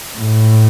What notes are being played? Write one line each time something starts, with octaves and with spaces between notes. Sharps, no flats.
A2